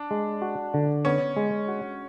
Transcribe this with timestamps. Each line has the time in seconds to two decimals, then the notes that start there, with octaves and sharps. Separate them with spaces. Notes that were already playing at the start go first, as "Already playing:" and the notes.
Already playing: D4
0.11 G#3
0.42 F#4
0.74 D3
1.05 B3 C#4
1.37 G#3
1.68 F#4